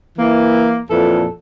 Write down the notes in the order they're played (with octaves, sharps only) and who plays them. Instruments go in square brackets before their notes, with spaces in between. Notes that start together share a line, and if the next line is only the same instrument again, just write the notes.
[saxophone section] E3 A#3
F2 A#2 E3 A4